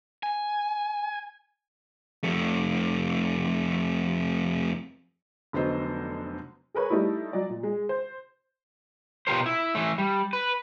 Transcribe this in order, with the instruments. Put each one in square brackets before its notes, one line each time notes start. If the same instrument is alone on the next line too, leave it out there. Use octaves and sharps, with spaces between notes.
[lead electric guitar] G#5
F2 A3
[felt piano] F1 D3 F#3 B3 C5 D#5
[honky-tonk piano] G#4 A#4 B4 C#5
G3 A3 D#4 E4
F#3 D5 D#5
A#2
G#3
C5
[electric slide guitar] B2 F4 G4 A#4 C5
E4
E3 A3
G3
B4